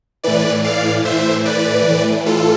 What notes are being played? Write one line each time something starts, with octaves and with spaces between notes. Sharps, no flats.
A2 E3 B4 D5
D5 F5
A2 E3 C5 E5
B4 D5
A2 E3
F4 A4